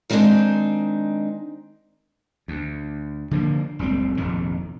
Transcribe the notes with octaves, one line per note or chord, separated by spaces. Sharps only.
D#3 G3 G#3 C4 D4 D#4
D2
D3 F3 A#3
F#1 C#2 G3 C4
F1 A#1 F2 D#3